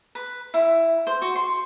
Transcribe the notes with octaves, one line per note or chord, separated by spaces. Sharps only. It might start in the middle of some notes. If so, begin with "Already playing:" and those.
B4
E4
C5
F#4
C6